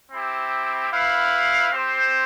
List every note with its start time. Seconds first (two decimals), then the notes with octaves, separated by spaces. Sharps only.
0.12 C4 E4 G4
0.92 E4 B4 F5
1.72 C4 G4 C5